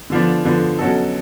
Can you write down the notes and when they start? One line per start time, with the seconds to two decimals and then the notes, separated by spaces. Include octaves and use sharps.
0.10 D3 F3 B3 D4
0.44 D3 F3 B3 D4
0.78 B2 F#3 C#4 F#4 A4